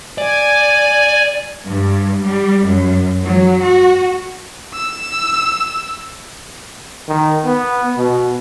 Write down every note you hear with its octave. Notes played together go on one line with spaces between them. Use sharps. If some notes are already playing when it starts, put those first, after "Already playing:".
D5 G#5
G2
G3
F#2
F#3
F#4
E6
D#3
B3
B2